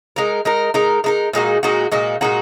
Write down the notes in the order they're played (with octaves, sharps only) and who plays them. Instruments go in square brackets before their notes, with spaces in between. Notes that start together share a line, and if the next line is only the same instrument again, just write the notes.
[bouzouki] G#3 D#4 A#4
G#3 D#4 A#4
G#3 D#4 A#4
G#3 D#4 A#4
A#2 G#3 D#4 F#4
A#2 G#3 D#4 F#4
A#2 G#3 D#4 F#4
A#2 G#3 D#4 F#4